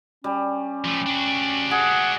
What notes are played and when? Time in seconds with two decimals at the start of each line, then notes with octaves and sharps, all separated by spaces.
0.24 G3 C#4
0.85 F3 A3
1.06 D4 F#4
1.71 G#4 F#5